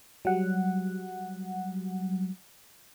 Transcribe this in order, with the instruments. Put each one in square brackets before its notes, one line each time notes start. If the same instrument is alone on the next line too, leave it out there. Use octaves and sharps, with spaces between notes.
[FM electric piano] F#3 G3 F#5